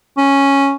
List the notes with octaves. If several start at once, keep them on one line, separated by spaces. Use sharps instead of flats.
C#4